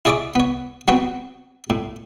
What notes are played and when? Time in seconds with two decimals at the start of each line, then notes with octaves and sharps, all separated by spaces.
0.05 E4 G#4 D5 E5 C#6 D6
0.35 B3 C#5
0.88 F#3 B3 C4 C#5 G5
1.70 A2